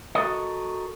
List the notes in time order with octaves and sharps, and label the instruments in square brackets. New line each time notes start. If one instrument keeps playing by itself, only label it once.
[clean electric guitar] F#4 A4 A#4 D#5